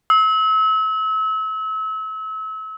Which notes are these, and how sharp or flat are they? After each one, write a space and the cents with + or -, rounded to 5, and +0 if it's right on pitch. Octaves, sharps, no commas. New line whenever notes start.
E6 -35